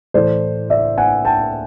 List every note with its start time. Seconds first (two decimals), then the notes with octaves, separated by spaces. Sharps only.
0.14 A2 E3 A3 C5 D5
0.70 D5 E5
0.98 F#5 G#5
1.25 G5 A5